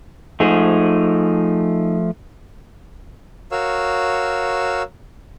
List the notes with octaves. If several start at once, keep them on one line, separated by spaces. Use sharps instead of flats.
F3 A3 D#4 G#4
F#4 A#4 C#5 F5 E6